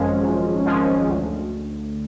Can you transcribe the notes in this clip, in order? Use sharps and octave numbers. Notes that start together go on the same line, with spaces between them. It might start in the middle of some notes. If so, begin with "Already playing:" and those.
Already playing: G#1 F#2 F3 G#3 C#4
G#1
F#2 F3 G#3 C#4
D2